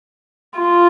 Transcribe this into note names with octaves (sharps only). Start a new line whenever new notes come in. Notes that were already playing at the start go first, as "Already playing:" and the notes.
F4